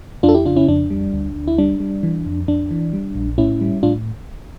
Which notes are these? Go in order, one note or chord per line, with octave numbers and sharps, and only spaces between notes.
F2 D4 F4
A4
E4 G4
C#3 D4 F4
C#4 E4
F2 D4
G3
D2
D2
E4
G3 D4
G3
E3
F2
F2 D4
E3
G3
A#1
A2 C#4 E4
G3
A2 D4 F4